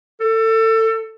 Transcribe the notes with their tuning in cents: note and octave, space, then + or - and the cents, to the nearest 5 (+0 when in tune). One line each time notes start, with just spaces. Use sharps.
A4 +25